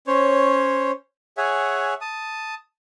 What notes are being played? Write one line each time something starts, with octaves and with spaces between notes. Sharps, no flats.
C#4 C5 C#5
G#4 C#5 E5 F#5 G#5
A5 D#6